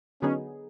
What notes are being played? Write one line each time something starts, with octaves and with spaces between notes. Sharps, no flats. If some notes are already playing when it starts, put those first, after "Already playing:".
D3 F#3 B3 C#4 D#4 G#4